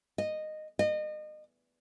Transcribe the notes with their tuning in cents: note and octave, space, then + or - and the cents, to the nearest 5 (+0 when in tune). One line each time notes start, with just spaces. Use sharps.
D#5 -10
D#5 -30